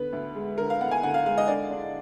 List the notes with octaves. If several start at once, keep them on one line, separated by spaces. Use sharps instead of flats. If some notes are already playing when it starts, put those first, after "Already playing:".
Already playing: D3 B3 B4
D2
G#3
D3 A#4
F5
B3 F#5
G#5
D2 F#5
F5
G#3 F5
D#5
D3 D5
D4